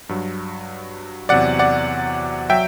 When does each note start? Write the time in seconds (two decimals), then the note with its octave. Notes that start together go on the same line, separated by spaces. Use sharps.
0.09 G2 F#3
1.29 E2 C3 F#3 D5 F#5
1.59 D5 F#5
2.50 F#3 E5 G5